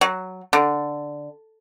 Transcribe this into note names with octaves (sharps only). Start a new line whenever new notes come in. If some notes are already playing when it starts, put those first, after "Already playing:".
F#3
D3